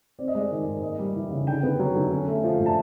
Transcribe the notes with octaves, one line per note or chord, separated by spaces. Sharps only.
C4 D5
D#5
G#3 D5
D#3
G#2
A#3 D#5
G3
E3
C#3
D3 G5
B3
F#3
D3
C#4
A3
F3
A2
A5